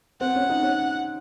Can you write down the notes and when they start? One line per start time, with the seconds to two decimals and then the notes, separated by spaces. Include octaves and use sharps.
0.21 C4 F#5
0.36 C#4
0.50 D#4
0.63 C#4